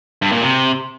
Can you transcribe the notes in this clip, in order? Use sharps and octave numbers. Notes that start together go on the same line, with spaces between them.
G2
A#2
C3